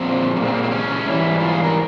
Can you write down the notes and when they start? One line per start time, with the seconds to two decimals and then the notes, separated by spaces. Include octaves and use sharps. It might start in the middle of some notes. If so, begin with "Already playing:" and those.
Already playing: A#2 F3 G#3 C4
0.36 A#2 A#3
0.41 G#3 C4
0.54 A#3
0.63 C4
0.71 C#4
1.06 G#2 E3 G3 E4
1.40 F4
1.52 G#4
1.64 A#4